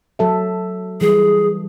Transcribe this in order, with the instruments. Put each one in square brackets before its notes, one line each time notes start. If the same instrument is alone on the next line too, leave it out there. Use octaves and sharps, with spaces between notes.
[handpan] F#3 A4 E5
[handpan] E3 G3 [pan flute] G#4